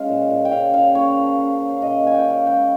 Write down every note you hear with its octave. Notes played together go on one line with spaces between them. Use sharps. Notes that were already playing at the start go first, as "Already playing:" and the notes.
Already playing: G#3 C#4 F5
A#2
A#2
G5
C#3 F5
C#3 F5
A#3 C#5
F3
C#3
C#3
A#2 D#5
A#2 G#5
G5
C#4
F5
G#3 G5